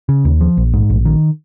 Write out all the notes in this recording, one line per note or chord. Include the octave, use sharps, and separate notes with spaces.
C#3
D#2
F3
A#1
G#2
A#1
D#3